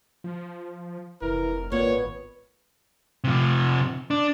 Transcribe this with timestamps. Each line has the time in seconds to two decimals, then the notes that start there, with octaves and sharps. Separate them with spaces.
0.24 F3
1.22 F1 E3 A#4
1.72 G#1 A#2 B3 C#5
3.24 C3 F3
4.11 D4